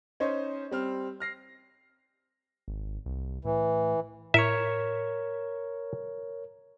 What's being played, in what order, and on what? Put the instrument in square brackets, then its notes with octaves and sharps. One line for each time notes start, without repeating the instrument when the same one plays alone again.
[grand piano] C#4 D#4 C5 C#5 D#5
G3 C4 F6
F6 A#6 C7
[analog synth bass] G#1
C2
[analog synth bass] A2 [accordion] E3
[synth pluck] A2 C#7 [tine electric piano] A#4 C#5 [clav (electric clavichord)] E5